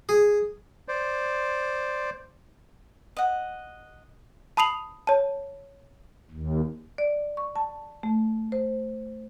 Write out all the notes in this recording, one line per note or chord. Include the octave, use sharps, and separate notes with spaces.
G#4
C5 D5
D#5 F#5
A5 B5 D#6 C7 F7 F#7
C#5 A5
D#2
D5
C#6
A5
A3
C5